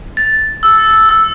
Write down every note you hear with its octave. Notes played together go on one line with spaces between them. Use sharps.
A6
E6
E6